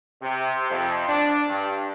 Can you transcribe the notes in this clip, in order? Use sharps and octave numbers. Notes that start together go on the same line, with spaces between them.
C3
F2
D4
G2